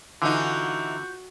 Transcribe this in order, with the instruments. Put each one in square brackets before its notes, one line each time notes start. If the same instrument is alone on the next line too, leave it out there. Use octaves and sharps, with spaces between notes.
[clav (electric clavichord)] D3 [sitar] E3 D#4 [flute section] F4 G6 [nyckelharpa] F#4